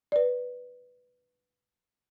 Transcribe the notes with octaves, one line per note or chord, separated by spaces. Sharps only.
B4 D5